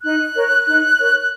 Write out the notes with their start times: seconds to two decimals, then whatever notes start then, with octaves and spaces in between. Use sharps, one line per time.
0.02 D#4 F#6
0.35 A#4 C#5
0.66 D#4
0.99 A#4 C#5
1.19 F#6